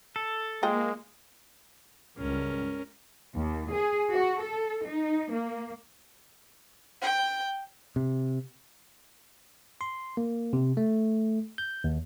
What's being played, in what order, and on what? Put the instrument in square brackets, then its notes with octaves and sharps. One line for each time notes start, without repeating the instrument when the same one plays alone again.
[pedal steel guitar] A4
[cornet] G#3 [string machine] A#3 [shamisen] F4 C5 G5
[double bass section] C#2 G2 [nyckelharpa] C#4 A#4
[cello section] D#2
G#4
F#4
A4
D#4
A#3
[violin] G5
[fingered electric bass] C3
[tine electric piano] C6
A#3
C3
A3
G6
D#2